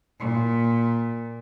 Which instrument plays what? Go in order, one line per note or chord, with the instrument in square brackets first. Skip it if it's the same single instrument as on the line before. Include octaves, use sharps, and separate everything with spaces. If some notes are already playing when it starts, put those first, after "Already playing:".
[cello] A#2